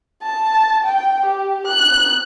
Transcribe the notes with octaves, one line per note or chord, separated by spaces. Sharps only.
A5
G5
G4
F#6